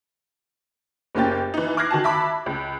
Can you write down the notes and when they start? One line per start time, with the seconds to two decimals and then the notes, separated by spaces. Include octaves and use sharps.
1.15 F#1 A#3 C#4 G4 A6
1.54 E3 D#4
1.77 D6 F6 F#6 G#6 A#6 C7
1.91 D#3 F#4 G#5 A5
2.04 E5 A5 B5 D6
2.46 C#2